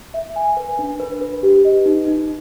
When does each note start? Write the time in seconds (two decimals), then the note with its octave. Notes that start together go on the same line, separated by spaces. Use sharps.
0.14 E5
0.36 G#5
0.57 B4
0.79 D4
1.00 B4
1.21 B4
1.43 G4
1.65 D#5
1.86 D#4
2.08 D#4